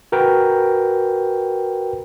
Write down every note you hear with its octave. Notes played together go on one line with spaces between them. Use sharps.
F#4 A#4 B4 G5